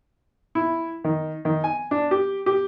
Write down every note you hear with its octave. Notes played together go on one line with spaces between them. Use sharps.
E4
D#3
D#3
G#5
D4
G4
G4